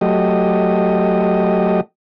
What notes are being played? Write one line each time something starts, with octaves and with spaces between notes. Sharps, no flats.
F#3 A3 G4 D#5